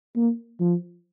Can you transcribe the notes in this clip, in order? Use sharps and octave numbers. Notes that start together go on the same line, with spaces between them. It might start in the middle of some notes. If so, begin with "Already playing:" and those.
A#3
F3